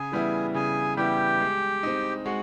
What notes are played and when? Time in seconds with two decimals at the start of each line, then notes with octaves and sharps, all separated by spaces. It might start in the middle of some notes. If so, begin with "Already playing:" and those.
Already playing: C#3 G#4 G#5
0.12 E3 G3 B3 E4
0.54 C#3 G#4 G#5
0.97 E3 G3 B3 E4 G4 G5
1.40 G#3
1.83 C4 D#4
2.26 G#3 F#4 F#5